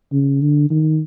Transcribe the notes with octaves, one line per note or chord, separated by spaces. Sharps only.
C#3
D3
D#3